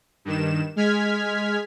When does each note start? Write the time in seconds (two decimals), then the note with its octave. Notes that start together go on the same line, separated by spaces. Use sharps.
0.25 G2 D#3 E7
0.76 G#3 F6 G#6 B6